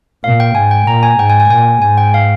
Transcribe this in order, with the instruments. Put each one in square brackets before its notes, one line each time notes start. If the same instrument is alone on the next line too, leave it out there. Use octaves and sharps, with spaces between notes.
[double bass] A#2 [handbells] F5
[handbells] G5
[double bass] G#2 [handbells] G#5
[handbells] G5
[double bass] A#2 [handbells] A#5
[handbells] G#5
[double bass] G#2 [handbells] G5
[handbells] G#5
G#5
G5
[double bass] A#2 [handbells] G#5
[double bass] G#2 [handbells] G#5
[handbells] G5
F5